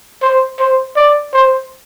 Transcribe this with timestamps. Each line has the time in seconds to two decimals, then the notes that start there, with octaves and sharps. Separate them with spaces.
0.22 C5
0.60 C5
0.96 D5
1.33 C5